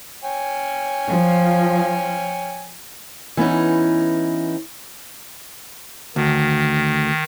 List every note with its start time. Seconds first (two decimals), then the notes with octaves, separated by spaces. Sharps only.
0.24 C#5 G5 G#5
1.09 F3
3.37 E3 B3 C#4 D#4
6.16 D2 D#3